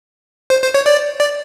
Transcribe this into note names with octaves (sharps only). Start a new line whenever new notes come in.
C5
C5
C#5
D5
D5